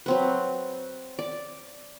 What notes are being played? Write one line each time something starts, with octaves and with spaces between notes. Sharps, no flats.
F#3 C4 B4
D5